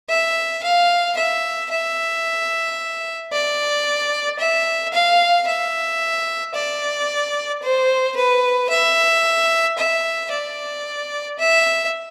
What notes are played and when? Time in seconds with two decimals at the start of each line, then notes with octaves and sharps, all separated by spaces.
0.09 E5
0.63 F5
1.17 E5
1.70 E5
3.32 D5
4.39 E5
4.93 F5
5.47 E5
6.55 D5
7.62 C5
8.16 B4
8.69 E5
9.78 E5
10.31 D5
11.39 E5